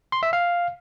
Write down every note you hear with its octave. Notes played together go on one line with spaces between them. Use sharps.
C6
E5
F5